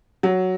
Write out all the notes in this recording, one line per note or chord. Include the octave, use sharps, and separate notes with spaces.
F#3